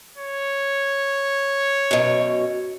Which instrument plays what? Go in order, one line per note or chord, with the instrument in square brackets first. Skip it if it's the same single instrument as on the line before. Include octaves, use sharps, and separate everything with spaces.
[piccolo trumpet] C#5
[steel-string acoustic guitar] F#2 B2